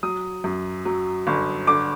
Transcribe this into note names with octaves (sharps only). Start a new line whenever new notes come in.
F#3 D#6
F#2
F#3
G1
D3 D6